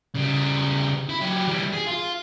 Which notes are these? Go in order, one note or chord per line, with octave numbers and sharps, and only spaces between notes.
C#3 G3
E4
F#3 G4
E3 G3
G#4
F4